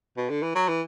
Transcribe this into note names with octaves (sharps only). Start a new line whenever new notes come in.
B2
D3
E3
F#3
E3